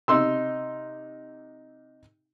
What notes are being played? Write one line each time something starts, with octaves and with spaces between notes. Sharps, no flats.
C3 D#4 C6 E6